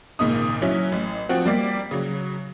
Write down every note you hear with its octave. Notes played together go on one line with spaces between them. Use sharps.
G#1 A#2 C#3 D#4 D#6
F#3 C#4 E4
A1
F3 C4 F#4
G3 A#3 D5
C#3 F#3